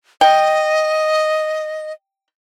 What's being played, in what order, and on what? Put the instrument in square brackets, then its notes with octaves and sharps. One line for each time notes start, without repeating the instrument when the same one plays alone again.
[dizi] D#5 [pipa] G5